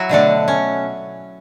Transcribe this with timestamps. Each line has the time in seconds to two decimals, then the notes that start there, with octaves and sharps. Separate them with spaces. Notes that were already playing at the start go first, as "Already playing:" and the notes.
Already playing: F#3 E4 F#4
0.09 B2 D3 A3 D4
0.48 C#4